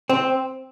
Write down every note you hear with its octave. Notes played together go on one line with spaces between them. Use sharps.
C4